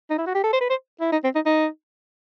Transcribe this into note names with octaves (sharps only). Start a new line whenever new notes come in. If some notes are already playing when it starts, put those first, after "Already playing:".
D#4
E4
F#4
G4
A4
C5
B4
C5
E4
D#4
C4
D#4
D#4